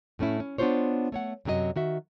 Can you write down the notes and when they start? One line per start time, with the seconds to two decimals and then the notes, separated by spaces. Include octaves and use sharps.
0.19 A2 A3 C#4 E4
0.40 C#4
0.58 B3 D4 E4 F4 C5 C#5
1.12 A3 C#5 F#5
1.45 F#2 C3 F#3 G4 D#5
1.76 D#3 F#4 E5